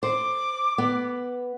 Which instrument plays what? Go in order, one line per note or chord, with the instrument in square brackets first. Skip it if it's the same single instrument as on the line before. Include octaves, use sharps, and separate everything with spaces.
[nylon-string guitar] C5 [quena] D6
[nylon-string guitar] B3